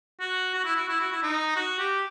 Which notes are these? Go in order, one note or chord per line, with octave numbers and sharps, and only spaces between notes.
F#4
F#4
E4
F#4
E4
F#4
E4
D#4
F#4
G4